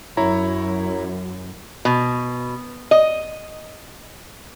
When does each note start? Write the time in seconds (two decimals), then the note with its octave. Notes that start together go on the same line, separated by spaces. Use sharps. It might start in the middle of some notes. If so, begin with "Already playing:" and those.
0.17 F#2 E4 C#5 A#5
1.85 B2
2.91 D#5